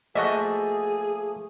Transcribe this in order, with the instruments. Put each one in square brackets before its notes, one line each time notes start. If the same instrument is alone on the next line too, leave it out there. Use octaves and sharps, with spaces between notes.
[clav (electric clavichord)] F3 A3 A#3 [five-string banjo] F#4 D#5 E5 [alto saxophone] G#4